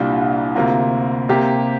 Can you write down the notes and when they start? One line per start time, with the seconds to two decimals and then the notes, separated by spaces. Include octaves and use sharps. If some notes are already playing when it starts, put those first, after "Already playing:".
Already playing: C2 A#2 G3 D4 F4
0.55 D2 C3 A#3 F4
1.29 C3 A#3 G4